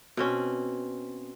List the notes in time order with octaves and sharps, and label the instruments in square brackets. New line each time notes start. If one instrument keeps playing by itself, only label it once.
[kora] B2 C4 C#4